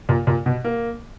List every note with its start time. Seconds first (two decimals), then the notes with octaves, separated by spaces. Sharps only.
0.09 A#2
0.27 A#2
0.46 B2
0.64 A#3